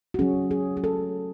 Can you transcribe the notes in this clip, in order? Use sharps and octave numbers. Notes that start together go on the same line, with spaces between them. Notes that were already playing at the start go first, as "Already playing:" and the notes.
F#4
F#3 C#4 G#4
G#4
G#4
A4